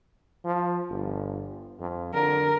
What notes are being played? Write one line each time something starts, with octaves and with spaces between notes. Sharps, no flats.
F3
G1
F2
D3 A#4